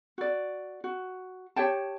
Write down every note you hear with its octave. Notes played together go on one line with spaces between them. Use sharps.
F#4 D5
F#4
G4 C#5 G5 A5